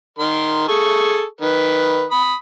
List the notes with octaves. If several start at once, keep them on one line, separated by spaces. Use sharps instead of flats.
D#3 A#4 C6
G#4 A4 C#6
D#3 B4
B5 D#6